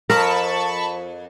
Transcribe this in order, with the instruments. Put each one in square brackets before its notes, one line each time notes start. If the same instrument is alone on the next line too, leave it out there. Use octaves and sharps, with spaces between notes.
[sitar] F2 [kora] A#4 [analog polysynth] A5 B5 C#6